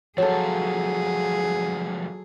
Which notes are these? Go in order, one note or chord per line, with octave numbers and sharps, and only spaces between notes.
D2 F3 F#3 G#4 A4 C#5